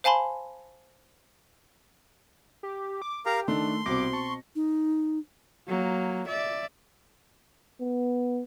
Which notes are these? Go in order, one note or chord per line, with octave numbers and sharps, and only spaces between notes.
C5 F5 G#5 A5 B5 C6
G4
D6
G4 A#4 F5 A#5
D#3 A3 D4 C6
C2 B2 C4 D6 A#6
A5 C#6
D#4
F#3 A#3
D5 E5
B3